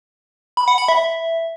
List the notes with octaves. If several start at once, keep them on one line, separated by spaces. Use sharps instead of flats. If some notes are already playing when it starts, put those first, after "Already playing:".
B5
F#5
B5
E5